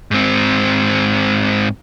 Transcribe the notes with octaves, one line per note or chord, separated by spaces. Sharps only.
G#2 C4